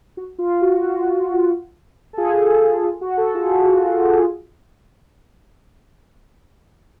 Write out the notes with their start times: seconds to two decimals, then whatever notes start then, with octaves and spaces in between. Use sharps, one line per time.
0.17 F#4
0.39 F4
0.61 F#4
0.83 F#4
2.13 A4
2.17 F4 G#4
2.84 F4 G#4
3.01 F#4
3.17 F#4 A4
3.34 F4 G#4
3.52 F#4
3.64 F#4
3.74 F4
3.86 F4
3.97 F#4
4.10 F#4
4.18 F4 G#4